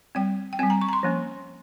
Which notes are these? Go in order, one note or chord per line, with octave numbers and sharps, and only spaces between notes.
G3 C4 G5
G5
G3 C4 G#5
A#5
C#6
A#5
C6
F3 A#3 C#4